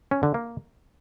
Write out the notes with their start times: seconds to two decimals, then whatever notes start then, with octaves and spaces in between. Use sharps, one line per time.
0.11 C#4
0.23 D3
0.34 A#3